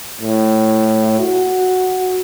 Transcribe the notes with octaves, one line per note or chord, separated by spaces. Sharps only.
A2
F#4